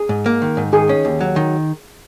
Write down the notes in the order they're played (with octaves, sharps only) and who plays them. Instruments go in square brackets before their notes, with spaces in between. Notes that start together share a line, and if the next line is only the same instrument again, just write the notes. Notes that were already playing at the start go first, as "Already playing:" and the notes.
Already playing: [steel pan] G#4
[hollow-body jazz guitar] G#2
A#3
D#3
G#2
[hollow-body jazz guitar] D#3 [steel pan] G#4
[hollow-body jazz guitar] C#4
D#2
F#3
D#3